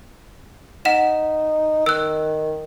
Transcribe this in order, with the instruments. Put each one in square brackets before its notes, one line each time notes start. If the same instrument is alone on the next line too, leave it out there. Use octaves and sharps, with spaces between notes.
[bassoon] D#4 [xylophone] F#5 E7
[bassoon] D#3 [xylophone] E6 F#6